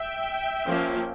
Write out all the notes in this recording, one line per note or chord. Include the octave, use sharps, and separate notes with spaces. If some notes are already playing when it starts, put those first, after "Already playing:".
Already playing: E5 G5
F3 A#3 C#4